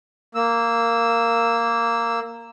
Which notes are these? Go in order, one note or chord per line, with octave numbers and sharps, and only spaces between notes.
A#3 E6